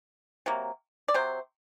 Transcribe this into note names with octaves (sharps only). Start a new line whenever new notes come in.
C3 F#3 A#3
D5
C3 F#3 C5